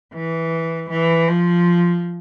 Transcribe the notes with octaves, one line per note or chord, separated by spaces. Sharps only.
E3
E3
F3